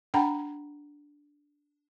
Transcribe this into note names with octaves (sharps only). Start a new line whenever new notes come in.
D4 F#5 G5 A#5 B5